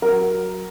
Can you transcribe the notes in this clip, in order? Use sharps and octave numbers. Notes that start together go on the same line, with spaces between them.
F#3 A#4